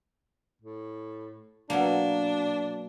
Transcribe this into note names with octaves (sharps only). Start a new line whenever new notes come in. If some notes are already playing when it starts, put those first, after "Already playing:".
A2
B2 F#3 A#3 D4